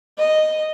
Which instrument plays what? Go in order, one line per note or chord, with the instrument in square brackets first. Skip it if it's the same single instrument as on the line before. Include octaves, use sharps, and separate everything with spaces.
[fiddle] D#5